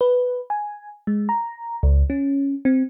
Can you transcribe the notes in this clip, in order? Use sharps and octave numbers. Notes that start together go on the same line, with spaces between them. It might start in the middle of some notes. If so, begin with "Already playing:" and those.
B4
G#5
G#3
A#5
C#2
C#4
C4